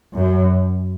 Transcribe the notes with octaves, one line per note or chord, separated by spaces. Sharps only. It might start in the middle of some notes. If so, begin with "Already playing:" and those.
F#2